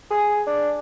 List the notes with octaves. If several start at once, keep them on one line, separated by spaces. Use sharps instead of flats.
G#4
D4